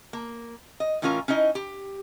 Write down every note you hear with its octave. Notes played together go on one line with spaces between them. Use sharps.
A#3
D#5
A2 E3 C#4 F4 A#4 G#5
C#4 D#4 E4 D#5
G4